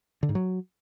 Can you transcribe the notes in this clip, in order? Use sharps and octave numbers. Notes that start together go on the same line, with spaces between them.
D3
G#2
F#3